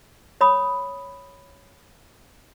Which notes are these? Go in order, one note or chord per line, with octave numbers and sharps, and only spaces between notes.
C#5 B5 D#6